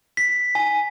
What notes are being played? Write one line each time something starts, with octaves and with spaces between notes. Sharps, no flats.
B6
G#5